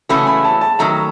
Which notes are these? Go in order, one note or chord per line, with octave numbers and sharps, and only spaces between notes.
C#3 E3 A3 C#4 F#4 B5
B5
A5
A5
D#3 F#3 A3 A#5